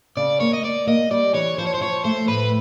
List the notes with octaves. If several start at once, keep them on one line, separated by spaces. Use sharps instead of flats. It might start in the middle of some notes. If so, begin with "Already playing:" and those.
C#3 D5
A#3 C#5
D#5
A#3 D5
A#3 D#5
G3 D5
E3 C#5
F3 C5
C#5
C5
F3 C#5
A3 C5
A2 B4